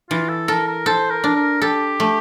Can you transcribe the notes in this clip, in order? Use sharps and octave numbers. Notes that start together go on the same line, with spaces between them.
E3 F4
A4
A4 A#4
A#4
A4 C5
A#4
D4
A#4
G4 A4
A3